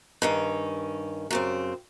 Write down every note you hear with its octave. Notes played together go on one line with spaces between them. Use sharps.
G2 D#3 C#4
F#2 C#3 C4